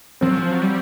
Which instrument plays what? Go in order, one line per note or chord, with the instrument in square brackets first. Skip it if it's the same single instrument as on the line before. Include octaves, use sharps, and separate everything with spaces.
[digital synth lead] F3 [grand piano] C4
[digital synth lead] F#3
F3
F#3
G3